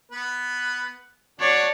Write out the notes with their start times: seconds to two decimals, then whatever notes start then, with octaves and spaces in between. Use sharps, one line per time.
0.12 B3 B4
1.40 D4 F#4 C#5 D5